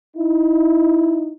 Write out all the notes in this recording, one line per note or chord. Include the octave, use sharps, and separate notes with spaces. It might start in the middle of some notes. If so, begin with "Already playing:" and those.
D#4 E4